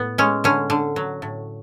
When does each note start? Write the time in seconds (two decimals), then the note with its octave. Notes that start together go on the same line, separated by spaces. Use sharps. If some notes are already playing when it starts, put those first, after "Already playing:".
Already playing: A2 B3
0.18 G#3 C#4
0.44 D3 C#4
0.70 D3
0.96 F#3
1.22 A2